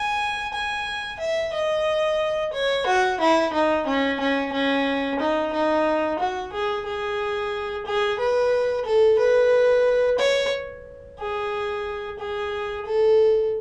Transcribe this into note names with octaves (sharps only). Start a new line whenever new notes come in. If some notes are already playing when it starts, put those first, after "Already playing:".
Already playing: G#5
G#5
E5
D#5
C#5
F#4
E4
D#4
C#4
C#4
C#4
D#4
D#4
F#4
G#4
G#4
G#4
B4
A4
B4
C#5
G#4
G#4
A4